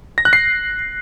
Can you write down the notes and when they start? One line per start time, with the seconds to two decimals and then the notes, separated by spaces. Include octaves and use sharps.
0.18 A#6
0.25 F#6
0.33 C7